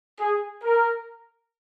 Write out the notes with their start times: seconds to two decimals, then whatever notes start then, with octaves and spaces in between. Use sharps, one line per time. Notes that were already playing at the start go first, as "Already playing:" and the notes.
0.20 G#4
0.64 A#4